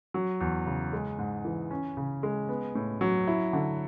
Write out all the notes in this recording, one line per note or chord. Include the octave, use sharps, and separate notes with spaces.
F#3
E2
C#3
G#3
G#2
E3
C#4
C#3
G#3
B3
A2
F#3
E4
D3